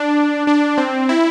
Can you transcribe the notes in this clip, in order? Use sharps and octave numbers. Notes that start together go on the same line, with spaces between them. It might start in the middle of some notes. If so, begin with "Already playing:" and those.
Already playing: D4
D4
C4
E4